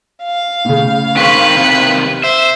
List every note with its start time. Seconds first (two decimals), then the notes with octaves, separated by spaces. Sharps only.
0.23 F5
0.65 A2 C#3
1.16 D#3 C4 B4 C#6 B6
1.56 C3 D#3
2.23 C5 E5